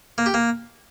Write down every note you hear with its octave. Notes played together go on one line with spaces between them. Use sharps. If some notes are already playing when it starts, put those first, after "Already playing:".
A#3
G4
A#3